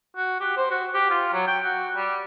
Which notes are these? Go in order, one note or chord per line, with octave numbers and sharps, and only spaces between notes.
F#4
G4
C5
F#4
G4
F4
F#3
G5
F#4
G3